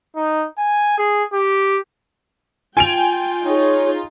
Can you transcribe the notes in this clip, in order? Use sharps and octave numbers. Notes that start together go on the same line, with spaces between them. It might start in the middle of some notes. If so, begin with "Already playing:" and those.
D#4
G#5
G#4
G4
F4 G5 G#5 D7 F7
D#4 G#4 C#5